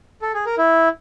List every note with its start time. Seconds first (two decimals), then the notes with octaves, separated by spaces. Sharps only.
0.22 A4
0.34 G#4
0.46 A#4
0.58 E4